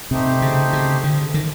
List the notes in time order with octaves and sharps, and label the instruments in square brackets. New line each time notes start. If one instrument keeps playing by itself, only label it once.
[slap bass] C3 [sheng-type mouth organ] A3 C4 D#4 G4 C5
[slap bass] C#3
C#3
D3
D#3